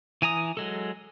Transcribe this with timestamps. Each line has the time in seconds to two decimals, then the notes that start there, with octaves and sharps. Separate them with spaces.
0.22 E3 G#5 A#5 D#6
0.57 F#3 G#3 A4